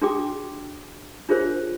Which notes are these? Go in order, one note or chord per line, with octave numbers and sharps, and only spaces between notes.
D4 F#4 G#4 A4 G5 D6
D4 F4 G#4 A#4 C5 C#5